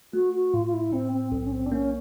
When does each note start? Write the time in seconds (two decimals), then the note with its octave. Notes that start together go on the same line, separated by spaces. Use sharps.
0.13 A3 F#4
0.33 F#4
0.54 A2 F4
0.66 F4
0.73 E4
0.92 A2 C4
1.12 C4
1.32 B1 C4
1.44 C#4
1.52 C4
1.66 D4
1.72 A#3 C#4